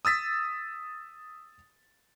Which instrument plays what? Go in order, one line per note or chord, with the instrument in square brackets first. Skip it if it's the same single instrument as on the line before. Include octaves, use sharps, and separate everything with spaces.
[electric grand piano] D#6 E6 A6 B6